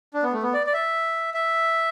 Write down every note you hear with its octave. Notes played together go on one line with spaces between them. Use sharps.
D4
B3
A3
B3
D5
D5
E5
E5